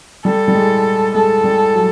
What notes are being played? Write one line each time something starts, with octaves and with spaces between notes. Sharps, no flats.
G3 A4
G3
G#3
G#3 A4
G3
F#3